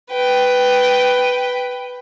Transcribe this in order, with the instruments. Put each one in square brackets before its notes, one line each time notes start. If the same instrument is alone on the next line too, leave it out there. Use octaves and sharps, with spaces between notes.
[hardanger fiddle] B4 G5